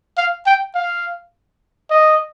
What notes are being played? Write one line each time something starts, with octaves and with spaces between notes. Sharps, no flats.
F5
G5
F5
D#5